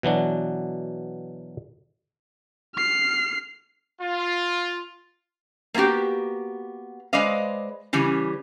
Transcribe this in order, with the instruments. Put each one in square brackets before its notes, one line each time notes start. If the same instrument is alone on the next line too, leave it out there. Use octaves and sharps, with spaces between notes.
[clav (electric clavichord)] B2 E3 F#3 D4
[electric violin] F6 C7
[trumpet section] F4
[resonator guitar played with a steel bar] A#3 B3 C#4 F#4 G4
G#3 B4 C5 D5 D#5 F5
C#3 E3 G3 C#4